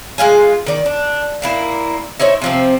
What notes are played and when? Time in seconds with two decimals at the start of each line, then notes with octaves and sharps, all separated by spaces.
0.18 G#3 F4 F5 G#5
0.66 D#3 D5
0.86 D4
1.42 A#2 A#3 E4
2.20 D#4 E4 C5 C#5
2.42 C3 F3 C4